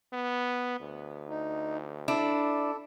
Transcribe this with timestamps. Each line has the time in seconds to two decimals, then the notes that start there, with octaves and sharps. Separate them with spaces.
0.13 B3
0.80 D2
1.29 D#4
2.08 D4 E4 A4